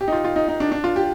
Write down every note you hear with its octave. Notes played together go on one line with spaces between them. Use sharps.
G4
D#4
F4
F4
D#4
D#4
D4
D4
F4
G4